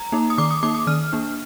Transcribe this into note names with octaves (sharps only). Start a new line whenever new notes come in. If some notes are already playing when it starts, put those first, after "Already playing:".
Already playing: A#5
A#3 D#4
D#6
D#3 D6
D#6
A#3 D#4 D6
D#6
D#3 F6
A#3 D4